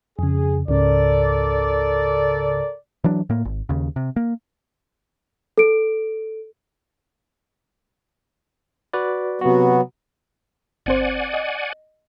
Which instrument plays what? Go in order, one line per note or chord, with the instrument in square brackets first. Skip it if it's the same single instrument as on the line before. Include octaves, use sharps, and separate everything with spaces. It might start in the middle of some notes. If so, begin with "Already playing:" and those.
[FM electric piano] F2 C#3 [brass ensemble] G#4
[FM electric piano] C#2 G#2 C#3 [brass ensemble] A4 A#4 D5
[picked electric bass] E3 F#3 D4
A2 A#3
G#1
D#2 C#3
C3
A#3
[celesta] A4 D7
[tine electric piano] F#4 B4 D5
[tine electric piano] C3 F#4 [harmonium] F#3 B3
[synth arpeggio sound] G1 C4 C5 [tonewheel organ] D5 F#5 G#5
[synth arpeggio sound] D#5